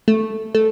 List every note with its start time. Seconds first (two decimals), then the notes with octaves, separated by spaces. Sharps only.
0.08 A3
0.55 A3